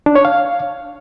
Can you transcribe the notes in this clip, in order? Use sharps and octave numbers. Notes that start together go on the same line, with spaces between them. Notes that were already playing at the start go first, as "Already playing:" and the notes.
D4
C#5
F5